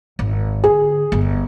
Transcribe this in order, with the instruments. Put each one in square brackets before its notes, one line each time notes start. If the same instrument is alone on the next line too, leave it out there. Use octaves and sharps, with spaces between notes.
[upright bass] G#1
[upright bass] D3 [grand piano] G#4
[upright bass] G1